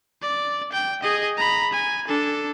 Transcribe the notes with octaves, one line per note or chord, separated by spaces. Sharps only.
D5
G5
G#4 D#5
A#5 B5
G#5
D4 A4